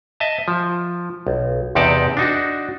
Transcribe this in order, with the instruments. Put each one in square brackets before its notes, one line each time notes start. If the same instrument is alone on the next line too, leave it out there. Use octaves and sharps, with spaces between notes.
[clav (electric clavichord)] D#5 E5 A5
F3
B1
E2 C3 D#4 G4 D5 A5
D4 D#4 F#4